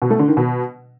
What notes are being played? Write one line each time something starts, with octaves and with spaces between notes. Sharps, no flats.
B2
A3
D3
D#3
B2